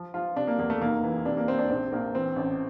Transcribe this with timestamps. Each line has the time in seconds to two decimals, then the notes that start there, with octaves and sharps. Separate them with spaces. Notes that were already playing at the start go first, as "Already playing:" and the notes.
Already playing: F3
0.14 F3 F4
0.36 C3 D4
0.47 A#3
0.59 E2 A#3
0.70 A3
0.81 F1 A#3
1.03 E3
1.26 C3 D4
1.37 A#3
1.48 C3 C4
1.59 D4
1.70 A#1 C4
1.92 A#1 A#3
2.14 E3 C4
2.36 A1